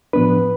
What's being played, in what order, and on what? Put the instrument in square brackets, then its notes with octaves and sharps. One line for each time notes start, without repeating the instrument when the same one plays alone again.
[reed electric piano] A2 F3 B3 D4 B4